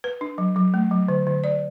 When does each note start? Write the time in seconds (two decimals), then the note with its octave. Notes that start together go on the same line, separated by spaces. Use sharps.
0.04 B4
0.21 D4
0.38 F#3
0.56 F#3
0.74 A3
0.91 F#3
1.08 D3
1.27 D3
1.44 D5